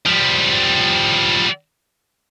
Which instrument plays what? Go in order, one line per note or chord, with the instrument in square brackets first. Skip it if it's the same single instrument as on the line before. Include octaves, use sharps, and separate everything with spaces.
[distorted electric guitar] F3 G3